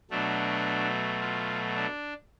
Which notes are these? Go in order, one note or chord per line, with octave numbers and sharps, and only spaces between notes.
B2 F#3 A3 D4
F4
D4